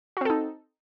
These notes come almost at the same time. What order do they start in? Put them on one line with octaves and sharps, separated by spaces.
F#4 C4 A4 D#4